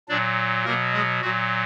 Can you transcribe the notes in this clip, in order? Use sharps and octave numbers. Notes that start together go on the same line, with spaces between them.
A#2 F#3 D4 D5
B2 F#3 A#3 A#4
G#3 G#4
A#2 F#3 F#4